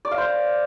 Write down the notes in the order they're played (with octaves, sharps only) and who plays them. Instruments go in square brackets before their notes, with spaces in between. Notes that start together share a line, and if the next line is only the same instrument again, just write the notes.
[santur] D5
F5
C5